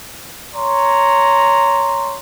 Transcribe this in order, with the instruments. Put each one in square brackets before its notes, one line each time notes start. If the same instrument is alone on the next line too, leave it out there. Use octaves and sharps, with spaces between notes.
[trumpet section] C#5 A#5 C6